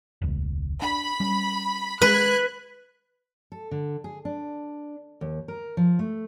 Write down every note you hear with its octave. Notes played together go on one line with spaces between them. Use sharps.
E1 C#2
D4 B5
G3 C#4
G#3 B4 F#6 G#6
A4
D3
G#4
D4
D#2
A#4
F3
A3